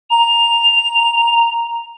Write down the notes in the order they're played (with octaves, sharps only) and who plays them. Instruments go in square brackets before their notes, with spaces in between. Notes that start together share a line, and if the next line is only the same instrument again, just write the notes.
[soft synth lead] A#5 [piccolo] F7